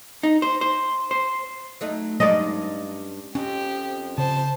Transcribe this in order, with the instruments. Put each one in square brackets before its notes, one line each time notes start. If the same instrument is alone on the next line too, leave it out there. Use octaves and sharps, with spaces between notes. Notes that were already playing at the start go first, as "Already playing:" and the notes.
[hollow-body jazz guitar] D#4
C5
C5
C5
[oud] F#3 A3 D#4
[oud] G2 C#4 D#4 [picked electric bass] F#3 G#3 [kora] D5 D#5
[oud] F2 F3 [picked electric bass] C#4 [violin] G4
[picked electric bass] C#3 [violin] C5 A5